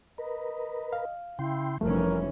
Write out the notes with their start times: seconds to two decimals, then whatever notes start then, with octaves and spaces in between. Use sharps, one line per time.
0.18 A#4 B4 D#5
0.93 F5
1.39 C#3 E4 G5 C6
1.81 F1 E3 F3 G3 A3 C#4 A#4